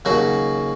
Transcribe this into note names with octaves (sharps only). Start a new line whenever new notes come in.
D#2 C#3 F#3 F#4